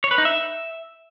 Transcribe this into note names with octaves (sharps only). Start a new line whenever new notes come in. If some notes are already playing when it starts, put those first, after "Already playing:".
C#5
B4
D#4
E5